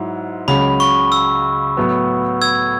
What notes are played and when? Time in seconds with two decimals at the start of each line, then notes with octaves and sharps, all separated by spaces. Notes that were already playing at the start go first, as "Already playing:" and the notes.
Already playing: G#2 F#3 E4
0.48 C#2 C#3 F#3 C#4 B5
0.80 C#6
1.12 E6
1.77 A2 F#3 B3
2.42 E6 G#6